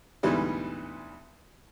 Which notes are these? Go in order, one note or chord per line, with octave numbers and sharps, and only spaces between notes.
D2 G#2 B2 E3 G3